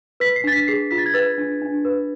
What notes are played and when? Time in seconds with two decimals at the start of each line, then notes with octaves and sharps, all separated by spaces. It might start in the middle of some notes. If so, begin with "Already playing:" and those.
0.20 B4 B6
0.36 C7
0.44 D4 A6
0.52 B6
0.67 G#4 C7
0.91 F4 B6
0.98 A6
1.06 G#6
1.14 B4 A6
1.38 D4
1.62 D4
1.85 B4